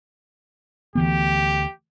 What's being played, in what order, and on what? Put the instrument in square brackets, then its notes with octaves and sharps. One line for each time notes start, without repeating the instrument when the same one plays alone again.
[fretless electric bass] D2 E3 B3 [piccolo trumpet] G4